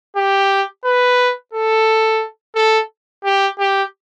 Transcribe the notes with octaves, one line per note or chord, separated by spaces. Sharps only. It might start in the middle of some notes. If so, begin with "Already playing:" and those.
G4
B4
A4
A4
G4
G4